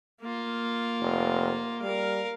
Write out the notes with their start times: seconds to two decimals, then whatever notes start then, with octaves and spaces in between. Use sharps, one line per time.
0.21 A#3 F4
1.01 F1
1.82 G3 A#4 F5